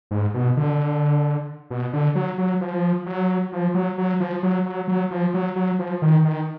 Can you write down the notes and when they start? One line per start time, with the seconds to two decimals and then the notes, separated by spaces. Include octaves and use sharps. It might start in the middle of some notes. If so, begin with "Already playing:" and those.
0.11 G#2
0.34 B2
0.57 D3
1.70 B2
1.93 D3
2.15 F#3
2.38 F#3
2.61 F3
3.06 F#3
3.52 F3
3.74 F#3
3.98 F#3
4.20 F3
4.43 F#3
4.66 F#3
4.88 F#3
5.11 F3
5.34 F#3
5.56 F#3
5.79 F3
6.02 D#3
6.25 D#3